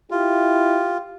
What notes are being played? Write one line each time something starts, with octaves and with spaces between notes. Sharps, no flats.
E4 F4 G4